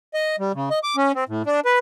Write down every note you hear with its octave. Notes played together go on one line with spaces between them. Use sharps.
D#5
G3
C#3
D#5
D6
C#4
C4
A2
D4
B4